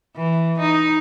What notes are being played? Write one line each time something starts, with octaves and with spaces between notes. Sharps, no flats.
E3
D#4